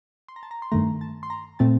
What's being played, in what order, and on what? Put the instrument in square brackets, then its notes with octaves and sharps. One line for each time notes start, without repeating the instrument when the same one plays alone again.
[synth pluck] C6
A#5
A5
A#5
C6
G2 D#3 A3 A#5
A5
C6
A#5
A#2 A3 C4 A5